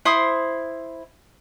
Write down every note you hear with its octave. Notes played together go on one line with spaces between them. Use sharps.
E4 C5 C6 D#6